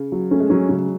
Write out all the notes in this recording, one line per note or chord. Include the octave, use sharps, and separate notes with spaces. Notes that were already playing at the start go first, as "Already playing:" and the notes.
Already playing: C#3
F#3
A3 C#4
G#3
F#3 C#4
C#3 F#3